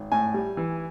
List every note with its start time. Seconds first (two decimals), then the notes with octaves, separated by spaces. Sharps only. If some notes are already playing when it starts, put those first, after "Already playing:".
Already playing: G#1
0.12 A2 G#5
0.34 G3
0.57 E3